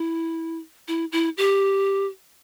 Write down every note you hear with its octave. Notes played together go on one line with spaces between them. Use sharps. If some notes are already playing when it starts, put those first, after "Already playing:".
Already playing: E4
E4
E4
G4